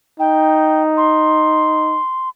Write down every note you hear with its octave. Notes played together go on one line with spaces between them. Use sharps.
D#4 G5
C6